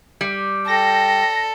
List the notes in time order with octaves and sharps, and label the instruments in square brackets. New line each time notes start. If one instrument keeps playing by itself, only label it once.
[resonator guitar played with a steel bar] G3
[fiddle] A4 [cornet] G5 [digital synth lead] A#6